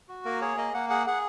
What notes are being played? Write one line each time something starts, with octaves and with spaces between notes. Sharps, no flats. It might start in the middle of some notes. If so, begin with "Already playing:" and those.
F#4
A#3 A#4
G#4 C#5
A#3 D#5
A#3 F#5
G#4 F#5
G#4 F#5